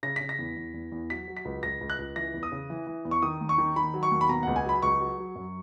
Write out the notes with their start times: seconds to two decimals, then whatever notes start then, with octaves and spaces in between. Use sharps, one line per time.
0.03 C#3 A#6
0.16 C#3 B6
0.29 A#6
0.39 E2
0.56 E2
0.74 E2
0.92 E2
1.10 F#3 B6
1.28 F#3
1.37 B6
1.45 C#2
1.63 C#2 A#6
1.81 C#2
1.90 F#6
1.98 C#2
2.16 E3 A#6
2.34 E2
2.43 D#6
2.52 C#3
2.70 E3
2.87 E3
3.05 E2
3.11 C#6
3.22 D#3 D#6
3.41 D#2
3.49 C#6
3.58 D#3
3.76 D#3 B5
3.94 F#3
4.03 C#6
4.11 D#2
4.21 B5
4.29 B2 A#5
4.43 C#2 F#5
4.56 G#5
4.65 F#3 B5
4.82 C#2 C#6
5.00 F#3
5.18 F#3
5.35 F#2